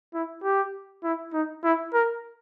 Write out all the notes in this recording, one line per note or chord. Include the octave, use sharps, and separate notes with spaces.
E4
G4
E4
D#4
E4
A#4